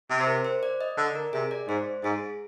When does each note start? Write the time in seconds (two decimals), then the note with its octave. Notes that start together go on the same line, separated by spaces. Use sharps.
0.10 C3
0.20 C5
0.27 A#4
0.45 C5
0.63 D5
0.81 D#5
0.97 D3 D5
1.15 A#4
1.33 C3 G#4
1.51 D5
1.68 G#2 C5
2.03 G#2 G#4